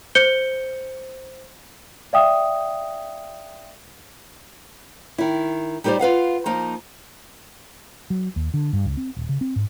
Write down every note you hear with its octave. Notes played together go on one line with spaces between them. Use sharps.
C5 G6 C#7 G7
D5 E5 F5 G5 D#6
D#3 E4
G3 D#4 G4 A#4 C5 D5
F4 B4 F5 F#5
F3 A#3 D#4
F#3
D#2
D3
G2
C#2
C4
D#1
C#3
C4
G#2